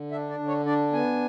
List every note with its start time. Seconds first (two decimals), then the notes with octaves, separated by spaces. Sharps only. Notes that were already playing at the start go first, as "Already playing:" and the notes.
Already playing: D3
0.11 D4 E5
0.30 D5
0.39 D3
0.48 C#5
0.66 D4 D5
0.92 B3 G#5